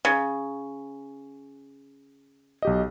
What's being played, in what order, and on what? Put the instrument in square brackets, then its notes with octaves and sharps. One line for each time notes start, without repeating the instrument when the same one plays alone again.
[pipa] C#3
[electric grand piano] B1 G4 D#5